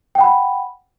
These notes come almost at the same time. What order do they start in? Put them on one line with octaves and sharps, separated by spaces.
G5 F#5 B5